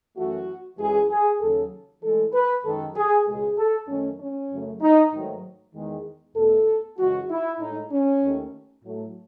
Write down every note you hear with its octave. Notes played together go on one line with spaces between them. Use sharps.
F#2 E3 A3 F#4
F#2 E3 G#3 G#4
G#4
D#2 C#3 F#3 A4
A2 E3 G#3 A4
B4
F#2 D#3 G#3 A4
G#4
C#2 B2 G#3 G#4
A4
F#2 D#3 A3 C#4
C#4
F#2 C#3 F#3 A3
D#4
G#2 D#3 F#3 A3
E2 D#3 G#3
E2 B2 A3 A4
F#2 C#3 E3 G#3 F#4
E4
A2 G#3 D#4
C#4
D#2 D#3 A3
A2 F#3 A3